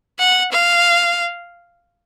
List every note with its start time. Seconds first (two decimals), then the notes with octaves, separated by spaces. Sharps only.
0.19 F#5
0.52 F5